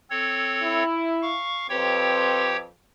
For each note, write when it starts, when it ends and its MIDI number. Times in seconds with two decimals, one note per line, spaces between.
0.10 0.83 60
0.10 0.83 69
0.10 0.83 73
0.63 1.33 64
1.22 1.67 77
1.22 1.67 85
1.70 2.65 41
1.70 2.65 60
1.70 2.57 67
1.70 2.65 71
1.70 2.57 73
1.70 2.57 79